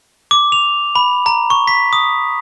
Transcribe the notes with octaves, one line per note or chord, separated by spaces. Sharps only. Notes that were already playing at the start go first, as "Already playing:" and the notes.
D6
F7
B5
A#5
C#6
B6
D#6